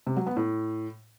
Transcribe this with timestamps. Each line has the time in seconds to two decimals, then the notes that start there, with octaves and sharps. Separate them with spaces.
0.07 C3
0.17 F#3
0.27 B3
0.37 A2